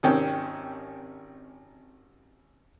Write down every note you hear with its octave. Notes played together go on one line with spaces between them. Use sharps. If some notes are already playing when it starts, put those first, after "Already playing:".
G#1 C3 D#3 C4 C#4 G5